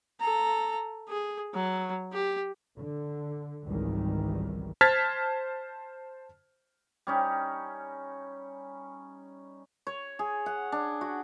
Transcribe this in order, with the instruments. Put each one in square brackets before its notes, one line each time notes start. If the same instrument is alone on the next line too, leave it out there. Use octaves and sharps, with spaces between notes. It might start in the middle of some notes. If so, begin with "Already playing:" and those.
[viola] A4 A#5
G#4
F#3
G4
[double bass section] D3
G#1 C#2 D#3 E3 G3
[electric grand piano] C5 A5 F6 G#6 A6 B6
[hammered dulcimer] G3 C#4 D#4
C#5
G#4
F#5
D4
F#4